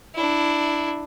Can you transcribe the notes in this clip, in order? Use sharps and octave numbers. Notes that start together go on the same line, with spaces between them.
D4 E4